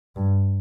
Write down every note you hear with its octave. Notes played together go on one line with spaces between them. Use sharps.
G2